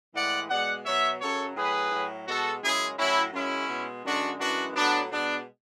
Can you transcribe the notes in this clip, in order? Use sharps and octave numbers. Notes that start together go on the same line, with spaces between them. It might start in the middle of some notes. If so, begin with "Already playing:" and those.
A2 E3 G#3 D5 F#5
B2 G#3 D5 F#5
B2 F#3 C#5 E5
F#2 C#3 F#3 A4 C#5
A2 F#3 G#4 B4
A2 F#3
B2 G#3 F#4 A4
F#2 C#3 G#3 E4 G#4
A2 F#3 C#4 E4
F#2 C#3 G#3 C#4 E4
B2 G#3
F#2 D3 G#3 D4 F#4
F#2 E3 G#3 D4 F#4
A2 F#3 B3 D4
B2 G#3 B3 D4